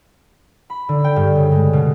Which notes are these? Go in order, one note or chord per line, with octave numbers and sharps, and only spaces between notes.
B5
D3
G5
G2
C#3
G#3
B2